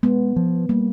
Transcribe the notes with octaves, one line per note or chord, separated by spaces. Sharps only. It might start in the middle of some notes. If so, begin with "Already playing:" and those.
G#3 B3
F3
G3 A#3